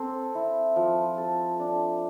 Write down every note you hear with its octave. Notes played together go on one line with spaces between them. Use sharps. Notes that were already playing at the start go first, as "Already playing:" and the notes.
Already playing: C4 A4
E4
F3
A4
D4